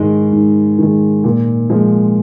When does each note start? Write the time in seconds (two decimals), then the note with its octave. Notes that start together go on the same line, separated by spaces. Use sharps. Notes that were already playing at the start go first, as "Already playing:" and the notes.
Already playing: G#2 D#3 G#3
0.32 G#2
0.79 D#3 G#3
1.24 A#2
1.70 F3 G#3